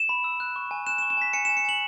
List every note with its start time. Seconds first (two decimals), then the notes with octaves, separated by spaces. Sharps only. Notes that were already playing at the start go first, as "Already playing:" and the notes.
Already playing: E7
0.09 B5
0.24 E6
0.40 F#6
0.56 C#6
0.71 G#5
0.87 F#6 E7
0.98 E7
1.02 C#6
1.10 E7
1.17 G#5 B6
1.33 G#5 C#7
1.45 G#5 E7
1.57 C#7
1.65 G#5 F#7